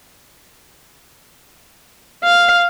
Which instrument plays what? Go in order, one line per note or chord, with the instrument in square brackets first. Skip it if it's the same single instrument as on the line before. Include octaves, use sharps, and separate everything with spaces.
[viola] F5